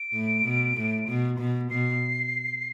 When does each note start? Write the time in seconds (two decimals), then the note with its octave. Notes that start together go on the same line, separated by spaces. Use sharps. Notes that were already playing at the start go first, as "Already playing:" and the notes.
Already playing: D7
0.13 A2
0.45 B2
0.76 A2
1.08 B2
1.39 B2
1.70 B2 C7